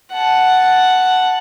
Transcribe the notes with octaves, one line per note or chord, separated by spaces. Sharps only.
F#5 A5